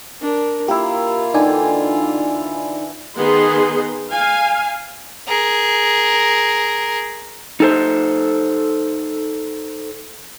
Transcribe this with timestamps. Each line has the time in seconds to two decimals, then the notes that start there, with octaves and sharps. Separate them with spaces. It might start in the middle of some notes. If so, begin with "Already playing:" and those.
0.21 D4 A#4
0.68 A#3 E4 F4 G4
1.34 D3 E3 D#4 D5 G5 G#5
3.16 D#3 B3 D#4 G#4 C6
4.12 F5 G#5
5.27 G#4 A#4
7.60 D#4 A4 C5